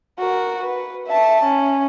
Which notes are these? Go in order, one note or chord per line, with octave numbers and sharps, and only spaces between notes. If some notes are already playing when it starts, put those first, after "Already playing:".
F#4 A#4
B4
E5 A5
C#4